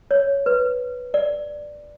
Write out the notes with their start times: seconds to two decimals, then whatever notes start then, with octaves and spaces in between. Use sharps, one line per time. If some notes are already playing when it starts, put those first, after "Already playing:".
0.11 C#5
0.46 B4
1.14 D5